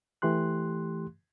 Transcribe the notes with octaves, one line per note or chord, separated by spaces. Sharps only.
E3 A3 G4 C6 F#6